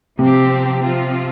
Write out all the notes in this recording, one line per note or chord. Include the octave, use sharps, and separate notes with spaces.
C3 F3 C4 G4
F3 C4 F4